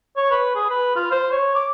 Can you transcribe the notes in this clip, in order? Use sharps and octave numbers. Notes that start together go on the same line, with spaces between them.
C#5
B4
G#4
B4
F4
C5
C#5
D6